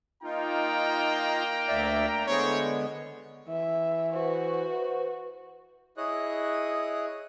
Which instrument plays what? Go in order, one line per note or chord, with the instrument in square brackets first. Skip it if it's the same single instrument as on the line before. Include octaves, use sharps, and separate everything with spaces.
[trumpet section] A#3 G5 A#5 [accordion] D#4 F4
[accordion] D2 D5 E5
[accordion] D3 G#3 B3 [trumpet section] E4 C5 C#5
[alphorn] E3 [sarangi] E5
[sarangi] F#4 [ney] B4 [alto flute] C5
[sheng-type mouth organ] E4 G#4 C#5 D#5 D#6 F#6